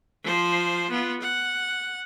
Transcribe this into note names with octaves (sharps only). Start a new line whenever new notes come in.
F3 C5
B3 F4
F#5